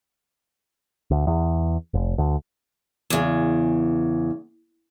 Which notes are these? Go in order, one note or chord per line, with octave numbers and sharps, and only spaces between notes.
D2
E2
F1
D2
E2 C#3